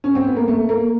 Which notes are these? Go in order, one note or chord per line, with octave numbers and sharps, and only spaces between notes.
C#4
C4
B3
A#3
A3
A#3